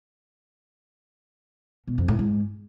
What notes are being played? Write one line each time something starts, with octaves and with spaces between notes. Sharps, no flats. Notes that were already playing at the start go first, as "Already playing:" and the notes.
B2
F2
A2
G#2